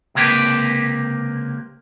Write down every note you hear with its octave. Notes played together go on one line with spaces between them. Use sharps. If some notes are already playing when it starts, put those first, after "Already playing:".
C#2 C3 A#3 G4 B4